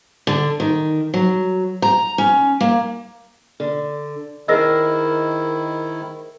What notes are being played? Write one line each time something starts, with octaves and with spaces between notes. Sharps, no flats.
D3
D#3
F#3
A#5
C#4
A#3
D3
D#3 E4 G#4 A#4 C5 D#5 E6 A#6